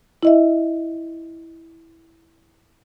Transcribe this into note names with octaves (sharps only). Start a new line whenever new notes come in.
E4 D#5 E5